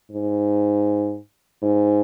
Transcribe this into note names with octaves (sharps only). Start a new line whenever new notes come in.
G#2
G#2